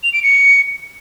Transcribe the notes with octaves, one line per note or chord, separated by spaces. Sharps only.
F7
D7
C#7